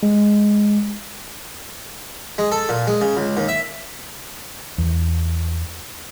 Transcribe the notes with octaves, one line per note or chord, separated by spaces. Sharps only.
G#3
G#3
A4
A#2
G#3
C#3
C#2
D#2
E5
E2